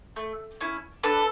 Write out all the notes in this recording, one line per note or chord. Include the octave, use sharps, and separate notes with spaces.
A3
C#4 E4
D4 A4 B4